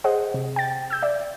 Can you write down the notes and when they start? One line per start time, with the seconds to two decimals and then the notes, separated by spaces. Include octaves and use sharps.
0.04 G#4 C5 D#5 F#5
0.34 C3
0.56 G5 A6
0.90 E6 G6
1.03 D5 E5